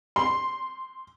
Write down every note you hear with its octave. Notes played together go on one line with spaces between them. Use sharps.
C6